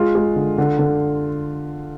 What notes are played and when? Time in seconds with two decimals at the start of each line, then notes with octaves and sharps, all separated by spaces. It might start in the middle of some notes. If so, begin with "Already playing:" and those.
Already playing: G#3 F4
0.15 G#3
0.36 D3
0.58 D3
0.79 D3